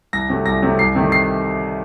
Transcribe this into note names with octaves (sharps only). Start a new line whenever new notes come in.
C2 A#6
C3 F#3 A3
C2 A#6
C3 F#3 A3
C2 C7
C3 D#3 A3
C7